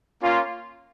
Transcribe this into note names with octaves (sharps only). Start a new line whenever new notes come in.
A#3 C#4 F4